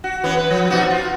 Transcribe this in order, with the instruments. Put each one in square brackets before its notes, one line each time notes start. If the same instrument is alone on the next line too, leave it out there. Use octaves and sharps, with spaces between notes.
[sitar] F#4
E3 B3 C#4
B4
F3
B2 D#4 F#4
F4